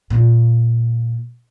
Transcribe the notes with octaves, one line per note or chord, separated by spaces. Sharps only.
A#2 A#3